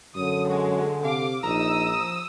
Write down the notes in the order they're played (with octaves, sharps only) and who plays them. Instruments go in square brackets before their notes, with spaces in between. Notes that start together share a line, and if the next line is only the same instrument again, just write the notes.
[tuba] F#2 [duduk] D3 [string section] D#6
[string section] G#3 [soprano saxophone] F#4
[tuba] C3 [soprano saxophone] F5 [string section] D6
[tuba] A#1 [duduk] D#4 [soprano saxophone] A#5 [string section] D#6 E6
[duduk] F3